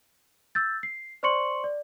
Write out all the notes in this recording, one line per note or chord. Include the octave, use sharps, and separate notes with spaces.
E6 G6 A6
C7
C5 D5 C6 C#6 C#7 F#7
D5